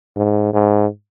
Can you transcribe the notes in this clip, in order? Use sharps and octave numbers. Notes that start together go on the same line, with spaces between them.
G#2
G#2